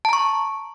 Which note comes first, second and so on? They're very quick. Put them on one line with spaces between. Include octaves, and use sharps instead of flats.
A5 A#5 C#6